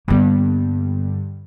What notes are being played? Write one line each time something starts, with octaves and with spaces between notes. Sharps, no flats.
G2 D3 G3 A#3 B3